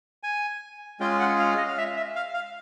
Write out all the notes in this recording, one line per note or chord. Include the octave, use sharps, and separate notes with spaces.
G#5
G#3 C#4 F4 G#4 G5
F#5
F5
D#5
F5
E5
E5
F5
F5